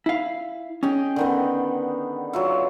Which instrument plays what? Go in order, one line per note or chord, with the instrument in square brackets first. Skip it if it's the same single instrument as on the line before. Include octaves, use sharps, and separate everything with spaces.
[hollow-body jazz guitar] E4 F5
[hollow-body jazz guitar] C#4 [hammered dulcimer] G#4 D#5 G5
[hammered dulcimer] D3 D#3 B3
F#3 F4 E5